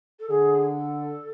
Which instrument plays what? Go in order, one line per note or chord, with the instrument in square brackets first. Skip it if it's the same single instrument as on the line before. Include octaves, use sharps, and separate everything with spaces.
[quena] A4
[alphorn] D3 [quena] G#4
[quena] A4